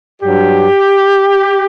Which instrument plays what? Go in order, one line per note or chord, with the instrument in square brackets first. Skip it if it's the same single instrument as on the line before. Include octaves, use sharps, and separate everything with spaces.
[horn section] G2 F#3 G4